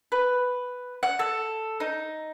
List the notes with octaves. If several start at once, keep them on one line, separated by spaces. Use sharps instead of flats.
B4
F#5
A4
D#4